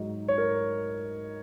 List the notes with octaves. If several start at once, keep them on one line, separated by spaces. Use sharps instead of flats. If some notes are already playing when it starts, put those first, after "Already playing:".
Already playing: G#2 F#3 D#4
C#5
A#4